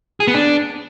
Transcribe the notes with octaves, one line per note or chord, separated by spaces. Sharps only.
G#4
B3
D4